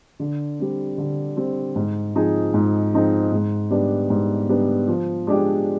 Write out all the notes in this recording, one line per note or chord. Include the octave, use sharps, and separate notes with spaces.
D3
G3 C4
D3
G3 C4
G#2
F3 C4 D#4 G#4
G#2
F3 C4 D#4 G#4
G#2
G3 B3 D4
G#2
G3 B3 D4
F3
G#3 D4 G4 D5